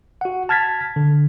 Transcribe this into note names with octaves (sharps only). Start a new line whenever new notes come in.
F#4 F#5
A5 F6 G#6 A6 B6
D3